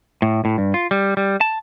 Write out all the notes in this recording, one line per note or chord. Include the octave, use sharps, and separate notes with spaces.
A2
A2
G2
F4
G3
G3
A5